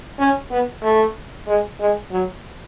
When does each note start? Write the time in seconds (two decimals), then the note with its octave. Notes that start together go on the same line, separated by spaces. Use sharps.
0.19 C#4
0.51 B3
0.83 A3
1.47 G#3
1.80 G#3
2.12 F#3